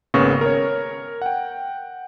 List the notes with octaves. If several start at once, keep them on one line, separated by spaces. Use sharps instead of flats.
G#1 C#3 A#3 B3 C#6 A#6
A#4 C#5
F#5 G5